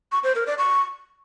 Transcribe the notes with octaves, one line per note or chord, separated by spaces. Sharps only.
C#6
C5
A#4
D5
C#6